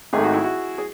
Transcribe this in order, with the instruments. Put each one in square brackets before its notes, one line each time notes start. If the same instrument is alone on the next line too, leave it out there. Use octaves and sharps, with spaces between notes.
[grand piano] G#1 G#2 D#3 A3 [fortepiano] G#4
[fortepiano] F#4
E4
F#4
G#4